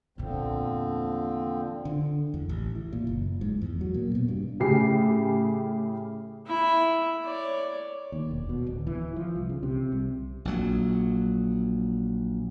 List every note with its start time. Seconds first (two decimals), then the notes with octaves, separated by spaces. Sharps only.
0.18 E2 A#2 D3 F3 C4
1.85 D3
2.34 E2
2.49 A1
2.75 E3
2.93 A#2
3.07 F#1
3.41 G#2
3.62 E2
3.81 F#3
3.94 A#2
4.15 B2
4.28 G2
4.60 A2 C#3 G4 C7
6.46 E4 E5
7.24 C#5 D5
8.12 D#2
8.31 E1
8.49 B2
8.67 D1
8.87 E3
9.16 F3
9.35 C2
9.49 C#3
9.63 C3
9.92 C2
10.45 A#1 F#3